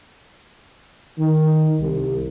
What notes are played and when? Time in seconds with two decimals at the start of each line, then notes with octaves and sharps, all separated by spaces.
1.18 D#3
1.80 C2